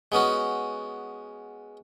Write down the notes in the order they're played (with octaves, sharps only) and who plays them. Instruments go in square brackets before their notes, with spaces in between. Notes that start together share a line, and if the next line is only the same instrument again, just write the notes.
[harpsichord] G#3 B3 C#4 F#4